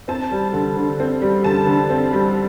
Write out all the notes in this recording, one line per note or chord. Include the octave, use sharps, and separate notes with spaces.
C4 A5
G3
D3
D3
C4
G3
D3 A5
D3
C4
G3